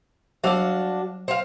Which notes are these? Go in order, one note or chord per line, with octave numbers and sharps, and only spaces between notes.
F#3 G3 D4 F#4 F5 D6
C4 F5